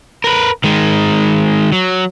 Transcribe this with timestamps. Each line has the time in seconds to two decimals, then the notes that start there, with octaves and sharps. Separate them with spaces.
0.24 A#4 B4
0.64 D#3 G#3
1.72 F#3